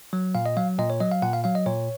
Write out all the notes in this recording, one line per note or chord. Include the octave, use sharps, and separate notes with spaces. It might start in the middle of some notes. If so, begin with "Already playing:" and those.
F#3
A#2 F5
D#5
F#3 F5
A#2 D#5
C#5
F#3 D#5
F5
A#2 F#5
F5
F#3 F5
D#5
A#2 C#5